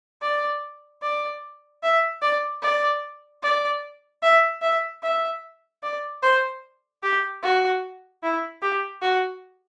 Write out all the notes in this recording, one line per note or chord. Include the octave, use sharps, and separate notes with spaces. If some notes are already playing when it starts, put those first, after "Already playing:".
D5
D5
E5
D5
D5
D5
E5
E5
E5
D5
C5
G4
F#4
E4
G4
F#4